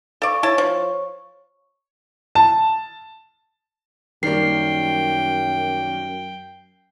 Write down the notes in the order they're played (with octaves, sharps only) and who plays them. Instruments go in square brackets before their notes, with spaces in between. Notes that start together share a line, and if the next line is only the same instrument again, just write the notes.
[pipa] A4 D5 [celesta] F5 C#6
[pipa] E4 A5 [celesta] C#5 C#6
[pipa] F3
[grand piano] A5
[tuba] F#2 [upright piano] D#3 G3 A#3 [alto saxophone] G5 [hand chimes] C7